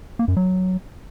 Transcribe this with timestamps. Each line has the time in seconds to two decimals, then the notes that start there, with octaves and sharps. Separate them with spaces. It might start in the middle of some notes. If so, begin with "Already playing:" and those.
0.19 A#3
0.28 F#2
0.37 F#3